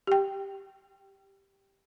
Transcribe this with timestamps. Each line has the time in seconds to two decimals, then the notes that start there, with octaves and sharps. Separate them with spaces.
0.07 G4 G5